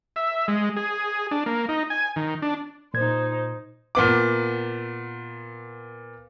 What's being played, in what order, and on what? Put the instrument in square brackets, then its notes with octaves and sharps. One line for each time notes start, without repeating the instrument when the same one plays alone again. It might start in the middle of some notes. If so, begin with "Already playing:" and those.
[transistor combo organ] E5
G#3
G#4
D4
A#3
D#4
G#5
D#3
D4
[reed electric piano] A#2 G#6 [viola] D#4 C5
[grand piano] A#2 B3 D6